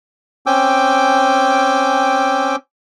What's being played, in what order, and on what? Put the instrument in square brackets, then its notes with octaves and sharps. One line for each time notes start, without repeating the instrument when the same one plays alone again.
[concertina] C4 C#4 G5 G#5 D6 E6